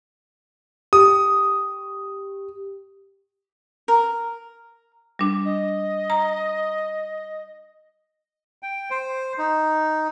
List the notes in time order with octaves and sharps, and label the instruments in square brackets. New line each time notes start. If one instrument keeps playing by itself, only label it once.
[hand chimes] G4 [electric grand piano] D#6
[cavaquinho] A#4
[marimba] G3 D4
[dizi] D#5
[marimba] A#5
[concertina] G5
C5
D#4